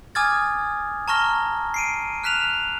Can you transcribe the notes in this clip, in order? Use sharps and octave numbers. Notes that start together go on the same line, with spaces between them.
G#5 D6 D#6 F6 G#6 A6
A5 A#5 C#6 F6 A#6 G7
C7 D7 D#7
F6 F#6 B6 E7 F7